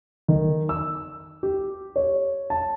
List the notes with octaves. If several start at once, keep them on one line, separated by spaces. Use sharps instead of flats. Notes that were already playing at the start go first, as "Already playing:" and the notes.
D#3
E6
G4
C#5
A5